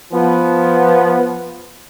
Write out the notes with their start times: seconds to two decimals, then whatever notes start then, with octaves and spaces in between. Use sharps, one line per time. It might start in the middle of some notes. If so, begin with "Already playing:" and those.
0.12 F3 B3